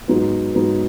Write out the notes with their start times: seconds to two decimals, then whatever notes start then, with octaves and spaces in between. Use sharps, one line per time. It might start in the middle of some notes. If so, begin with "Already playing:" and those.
0.08 G#2 F#3 B3 D#4
0.55 G#2 F#3 B3 D#4